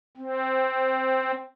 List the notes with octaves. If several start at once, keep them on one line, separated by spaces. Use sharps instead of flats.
C4